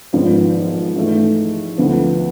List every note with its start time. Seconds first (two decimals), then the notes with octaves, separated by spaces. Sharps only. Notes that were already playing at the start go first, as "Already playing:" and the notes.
0.13 G#1 G#2 F3 B3 F4
0.96 G#2 E3 A3
1.78 D2 D3 F3 B3